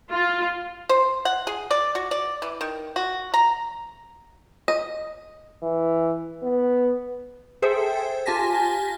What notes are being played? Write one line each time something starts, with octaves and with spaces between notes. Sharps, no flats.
F4
C5
F#5
G#4
D5
F#4
D5
E3
D#3
F#4
A#5
D#5
E3
B3
G#4 A4 C5 E5 G5
F4 G4 G#5 A5 A#6 B6